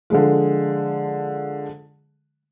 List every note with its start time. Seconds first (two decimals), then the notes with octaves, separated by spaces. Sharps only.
0.10 D3 F3 G#3